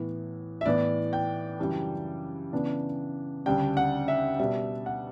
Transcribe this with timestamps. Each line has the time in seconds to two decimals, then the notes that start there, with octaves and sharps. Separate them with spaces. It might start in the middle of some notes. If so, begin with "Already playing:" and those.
Already playing: A2 E3 B3
0.61 E5
0.65 A2 E3 B3 D5
1.13 G5
1.59 F#2 C#3 E3 G3 D4
2.52 C#3 E3 B3 D4
3.46 D2 C#3 G3 D4 G5
3.77 F#5
4.08 E5
4.39 B2 G3 D4 E5
4.86 F#5